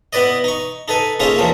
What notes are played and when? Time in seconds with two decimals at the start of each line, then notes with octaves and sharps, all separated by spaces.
0.13 B3 E4 B4 D5 D#5
0.44 D#4 C#6
0.88 D#4 A4 B4 G#5
1.20 A#3 C#4 D#4 F4 G#4 E5
1.38 D#2 E3 F3 G3 A3 A#3